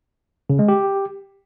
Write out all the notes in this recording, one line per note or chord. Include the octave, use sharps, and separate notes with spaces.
C#3
G#3
G4